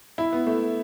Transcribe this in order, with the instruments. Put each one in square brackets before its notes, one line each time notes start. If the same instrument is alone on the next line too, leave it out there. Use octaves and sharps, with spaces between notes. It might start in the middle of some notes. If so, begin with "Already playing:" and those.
[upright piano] E4
B3
A3